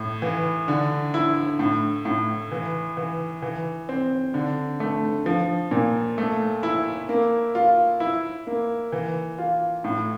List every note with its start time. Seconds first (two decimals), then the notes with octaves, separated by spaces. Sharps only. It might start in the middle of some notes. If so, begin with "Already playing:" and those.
Already playing: A2
0.22 E3
0.68 D3
1.14 E4
1.59 A2
2.05 A2
2.51 E3
2.97 E3
3.42 E3
3.89 C4
4.34 D3
4.80 A3
5.26 F3
5.71 A#2
6.18 A3
6.63 E4
7.09 A#3
7.55 F4
8.00 E4
8.47 A#3
8.92 E3
9.38 F4
9.84 A2